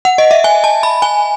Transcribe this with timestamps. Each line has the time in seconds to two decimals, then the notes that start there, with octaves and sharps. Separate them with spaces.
0.05 F#5
0.18 D#5
0.31 E5
0.44 G#5
0.64 A5
0.83 B5
1.02 G#5